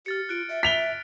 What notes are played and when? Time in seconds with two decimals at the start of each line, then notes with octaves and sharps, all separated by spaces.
0.06 G4 F6 A6 C#7
0.29 F4 F#6 D7
0.49 E5
0.63 E5 B6 F7 G7